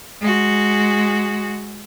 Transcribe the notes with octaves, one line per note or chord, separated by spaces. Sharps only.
G#3 F#4